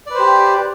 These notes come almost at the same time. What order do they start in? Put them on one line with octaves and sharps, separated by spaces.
D5 B4 C5 G4